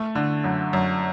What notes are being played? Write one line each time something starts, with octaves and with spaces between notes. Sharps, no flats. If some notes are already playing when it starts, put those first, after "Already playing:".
Already playing: A3
D3
F#2
F#2